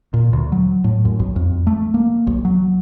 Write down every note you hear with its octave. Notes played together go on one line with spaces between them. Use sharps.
A#2
D2
F#3
A2
F#2
B1
F2
A3
A#3
B1
F#3